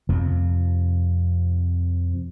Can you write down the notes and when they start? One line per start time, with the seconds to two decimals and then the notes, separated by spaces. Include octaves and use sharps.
0.09 F2 C3 F3